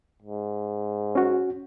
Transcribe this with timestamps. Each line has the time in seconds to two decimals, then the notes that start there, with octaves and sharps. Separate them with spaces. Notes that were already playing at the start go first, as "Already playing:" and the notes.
0.22 G#2
1.15 C#4 F#4